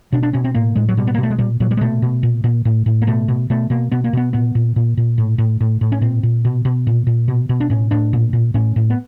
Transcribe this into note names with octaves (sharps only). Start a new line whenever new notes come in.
B2 D4
D4
B2 C#4
C4
A2 A#3
A2 G#3
F#3
B2 G3
B3
A#3
B2 A3
G#3
A#2 G3
A#2 F#3
G3
G#3
B2 A3
B2
A#2
A#2
A2
A2
A#3
B2 A3
B2
B2 A3
B2 A#3
B2 B3
A#3
B2 B3
A#2 B3
A#2
A#2
A#2
A2
A2
A2
A2
C#4
A#2 C4
A#2
B2
B2
A#2
A#2
B2
B2
D4
A2 C#4
A2 D4
A#2
A#2
A2 C#4
A2
B3